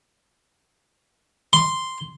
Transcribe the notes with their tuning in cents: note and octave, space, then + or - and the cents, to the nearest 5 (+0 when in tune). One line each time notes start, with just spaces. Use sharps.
C6 -5